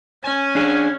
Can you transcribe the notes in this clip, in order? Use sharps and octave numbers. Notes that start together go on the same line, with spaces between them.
C#4 G#5
D4 G#4